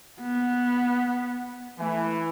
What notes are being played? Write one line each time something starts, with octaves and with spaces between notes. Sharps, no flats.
B3
E3 A3